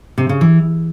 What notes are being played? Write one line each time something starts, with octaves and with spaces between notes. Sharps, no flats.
C3
C#3
E3